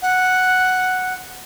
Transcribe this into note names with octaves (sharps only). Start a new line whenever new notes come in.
F#5